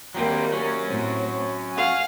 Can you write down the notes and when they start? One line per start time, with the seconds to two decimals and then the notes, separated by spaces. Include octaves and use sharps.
0.15 D#2 F#3 G3 A#3 C4
0.52 F#3 C#4
0.85 A2 C4 C#5
1.73 F5 F#5 G#5